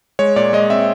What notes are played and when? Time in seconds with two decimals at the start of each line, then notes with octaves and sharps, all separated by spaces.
0.19 G#3 C#5
0.36 A#2 D5
0.53 G#3 D#5
0.70 C4 E5